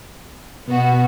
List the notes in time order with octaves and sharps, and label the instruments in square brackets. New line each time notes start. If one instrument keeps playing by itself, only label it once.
[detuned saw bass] B2 [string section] B3 F#4